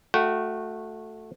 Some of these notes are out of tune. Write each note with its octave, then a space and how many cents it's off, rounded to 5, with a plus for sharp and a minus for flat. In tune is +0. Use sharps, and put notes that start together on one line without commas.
A3 +0 F#4 -20 G5 -35